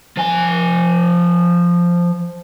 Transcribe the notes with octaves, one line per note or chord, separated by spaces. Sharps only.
F3 G#5